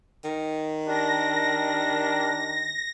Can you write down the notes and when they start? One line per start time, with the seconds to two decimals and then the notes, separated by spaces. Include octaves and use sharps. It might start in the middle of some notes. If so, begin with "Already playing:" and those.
0.24 D#3
0.88 D4 G4 A#4 A#6